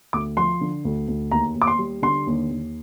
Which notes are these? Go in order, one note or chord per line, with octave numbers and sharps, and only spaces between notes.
D2 D6
F3 C6
D3
D2
D2
D#2 A#5
D#2
D6
C6
G3
D3 C6
D#2
D#2